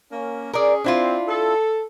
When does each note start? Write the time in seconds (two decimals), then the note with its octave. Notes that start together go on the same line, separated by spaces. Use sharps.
0.12 A#3 C#4
0.53 C#4 G#4 A#4 D5
0.84 C4 D4 E4 F4
1.28 A4